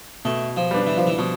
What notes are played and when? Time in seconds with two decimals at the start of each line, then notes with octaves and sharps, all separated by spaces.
0.25 B2 A3
0.57 F3
0.71 G3 B3 D4
0.87 E3
0.97 F3
1.07 E3
1.18 B2 F3